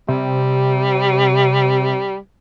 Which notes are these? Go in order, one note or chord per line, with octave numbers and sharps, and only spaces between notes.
C3 G3